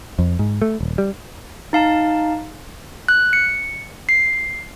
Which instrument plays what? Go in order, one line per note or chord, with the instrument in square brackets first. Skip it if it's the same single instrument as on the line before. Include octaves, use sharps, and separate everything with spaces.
[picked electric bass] F2
G#2
A3
D#1
G3
[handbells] D#4 F5 A5
F#6
C#7
C7